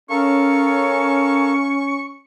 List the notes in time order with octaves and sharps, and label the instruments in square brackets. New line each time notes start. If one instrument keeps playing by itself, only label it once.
[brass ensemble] C#4 [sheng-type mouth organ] A4 A#4 F5 [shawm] C#6